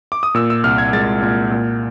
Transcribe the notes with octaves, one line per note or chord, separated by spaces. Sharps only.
D6
D#6
A#2 E6
E6
C2 F6
G#6
G#3 A6
A#2
A#2